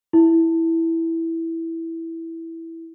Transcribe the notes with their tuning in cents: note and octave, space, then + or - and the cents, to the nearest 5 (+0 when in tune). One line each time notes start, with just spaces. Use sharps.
E4 -5